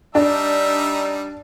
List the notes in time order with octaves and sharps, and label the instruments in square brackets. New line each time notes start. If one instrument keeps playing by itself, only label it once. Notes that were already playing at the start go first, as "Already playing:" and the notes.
[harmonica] G3 D#4 E5 [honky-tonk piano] D4